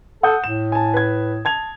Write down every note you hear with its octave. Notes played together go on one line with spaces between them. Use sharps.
A4 F#5 D#6 G6
A2 E7
G#5 A5
B4 G#6
A5 G#6 F7